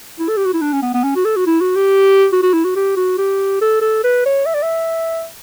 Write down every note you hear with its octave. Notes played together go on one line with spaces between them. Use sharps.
E4
A4
G4
F#4
E4
D4
C#4
B3
B3
C#4
F#4
A4
F#4
E4
F#4
G4
F#4
F#4
E4
F#4
G4
F#4
G4
A4
A4
B4
C#5
E5
D5
E5